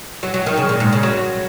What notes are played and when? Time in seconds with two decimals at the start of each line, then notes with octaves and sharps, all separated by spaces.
0.23 F#3
0.34 F#3
0.46 D#3
0.57 C#3
0.69 A#2
0.80 G#2
0.93 C#3
1.03 F#3